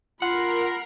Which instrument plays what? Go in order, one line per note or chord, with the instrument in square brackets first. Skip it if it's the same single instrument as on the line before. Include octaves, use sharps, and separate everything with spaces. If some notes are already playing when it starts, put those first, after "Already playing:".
[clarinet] F4 [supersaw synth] A#4 [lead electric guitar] F#5 [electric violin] B5 C7